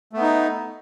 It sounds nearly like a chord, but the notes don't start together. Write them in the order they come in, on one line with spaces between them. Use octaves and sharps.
A3 B3 D#4